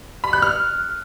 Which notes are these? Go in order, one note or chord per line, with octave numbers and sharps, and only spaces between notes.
B5
F#6
F6